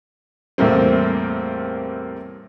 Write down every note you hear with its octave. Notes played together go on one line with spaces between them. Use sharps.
E2 A2 C3 G3 A#3 C4